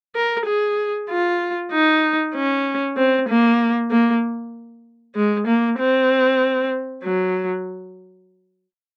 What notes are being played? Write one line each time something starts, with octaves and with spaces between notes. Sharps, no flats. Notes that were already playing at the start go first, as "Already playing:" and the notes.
A#4
G#4
F4
D#4
C#4
C4
A#3
A#3
G#3
A#3
C4
F#3